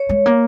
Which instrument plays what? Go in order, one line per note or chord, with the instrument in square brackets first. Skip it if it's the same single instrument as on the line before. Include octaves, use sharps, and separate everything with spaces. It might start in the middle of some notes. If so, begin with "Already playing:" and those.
Already playing: [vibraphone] C#5
[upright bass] G#3
A#3